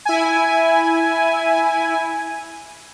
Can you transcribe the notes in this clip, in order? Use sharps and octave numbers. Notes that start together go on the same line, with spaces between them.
E4 G#5